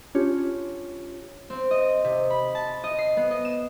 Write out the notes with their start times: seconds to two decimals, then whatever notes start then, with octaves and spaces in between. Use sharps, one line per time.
0.15 C#4 D4 F4 G4 C#5
1.50 C4
1.71 D#5
2.04 C3
2.30 B5
2.55 A5
2.84 D#5
2.99 C7
3.17 B3
3.31 D#5
3.45 E7